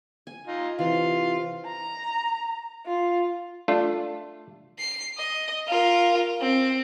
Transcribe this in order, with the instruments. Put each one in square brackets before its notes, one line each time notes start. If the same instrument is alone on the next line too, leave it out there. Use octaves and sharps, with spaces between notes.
[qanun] G#5
[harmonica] D#4 F4
[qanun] C3 E3 [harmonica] F4
[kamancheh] A#5
F4
[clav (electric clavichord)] A3 D4 F4
[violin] C7
D#5
F4 A#4
C4